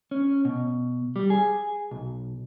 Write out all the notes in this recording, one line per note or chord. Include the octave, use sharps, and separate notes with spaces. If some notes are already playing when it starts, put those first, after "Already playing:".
C#4
B2
G3
G#4
B1